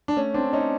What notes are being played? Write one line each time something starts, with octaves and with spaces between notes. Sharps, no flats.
D4
A3 C#4
C4 D4
A3
C#4 D#4